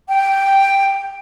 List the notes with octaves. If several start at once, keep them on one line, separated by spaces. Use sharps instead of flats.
G5